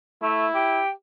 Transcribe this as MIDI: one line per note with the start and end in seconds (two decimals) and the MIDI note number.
0.22 0.47 57
0.22 0.82 64
0.55 0.90 67